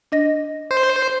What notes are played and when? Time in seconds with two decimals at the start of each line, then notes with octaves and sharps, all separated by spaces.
0.12 D4 D#5 A#6
0.71 C5